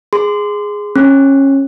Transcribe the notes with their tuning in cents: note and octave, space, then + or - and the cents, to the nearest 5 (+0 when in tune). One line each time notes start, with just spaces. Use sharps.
G#4 +0 C6 -20
C#4 -20 G#4 +20